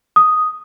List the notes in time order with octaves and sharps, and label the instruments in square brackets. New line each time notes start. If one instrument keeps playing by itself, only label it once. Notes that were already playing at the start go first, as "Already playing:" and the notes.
[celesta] D#6